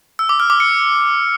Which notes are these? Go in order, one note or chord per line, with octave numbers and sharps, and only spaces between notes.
E6
D6
F6
D6
C#7